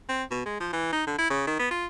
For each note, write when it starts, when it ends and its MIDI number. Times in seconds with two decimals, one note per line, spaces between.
0.09 0.23 60
0.31 0.43 47
0.46 0.57 56
0.60 0.69 53
0.73 0.92 52
0.93 1.04 63
1.07 1.16 50
1.18 1.30 64
1.30 1.44 49
1.47 1.55 51
1.59 1.70 59
1.71 1.86 65